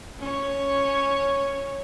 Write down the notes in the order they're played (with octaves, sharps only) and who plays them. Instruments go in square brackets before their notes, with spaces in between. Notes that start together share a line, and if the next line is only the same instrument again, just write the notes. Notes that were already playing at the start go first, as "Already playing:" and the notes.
[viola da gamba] C#4 C#5